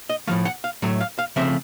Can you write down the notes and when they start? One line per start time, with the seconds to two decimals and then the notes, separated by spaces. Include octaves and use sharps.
0.09 D#5
0.27 A2 F3 A3 F5
0.45 F#5
0.64 F5
0.82 A2 F#3 A3
1.00 F5
1.19 F5
1.36 C#3 F3 A3 C4 E5